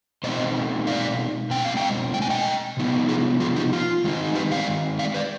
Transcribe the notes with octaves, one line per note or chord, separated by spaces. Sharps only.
B2 G#3 C4 D#4 C5 D#5
D5 F5
B2 G#3 C4 G5
F5
D#5 G5
G5
G#5
D#5 G5
C3 F3 B3 D#4
F4 G#4
F4 G#4
D#4 G4
F4
D#3 G#3 C4 D#4
G4 B4
D5 F5
D5 F5
B4 D5